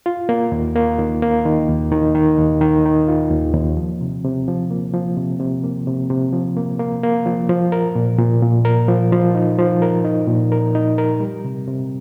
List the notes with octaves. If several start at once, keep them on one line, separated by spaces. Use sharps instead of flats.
F4
A#3
D#2
A#3
D#3
A#3
D#3
D#2
D#3
D#3
D#2
D#3
D#3
F4
D#2
D#2
F3
C3
C3
F3
A#3
F3
C3
C3
A#3
C3
C3
F3
A#3
A#3
A#3
F3
F3
A#4
A#2
A#2
A#2
A#4
F3
F3
D#4
F3
A#4
D#4
A#2
A#4
D#4
A#4
G3
C3
C3